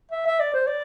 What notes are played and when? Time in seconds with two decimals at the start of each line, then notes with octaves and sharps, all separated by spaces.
0.11 E5
0.26 E5
0.40 D5
0.53 C5
0.67 D5